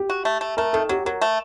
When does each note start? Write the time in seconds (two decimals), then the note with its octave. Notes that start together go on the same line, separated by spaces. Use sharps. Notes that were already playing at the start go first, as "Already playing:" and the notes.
Already playing: G4
0.10 F#4
0.25 A3
0.41 A3
0.57 A3 A#4
0.73 D#3 A4
0.89 F#3 G4
1.05 F#3 A#4
1.21 A3